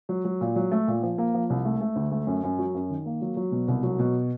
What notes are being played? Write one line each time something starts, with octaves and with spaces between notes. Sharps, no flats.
F#3
F#3
A#2
F#3
A3
A#2
F3
A#3
F3
C2
A3
A3
D2
A3
F#2
F#2
F#3
F#2
D#3
A#3
F#3
F#3
B2
C2
F#3
B2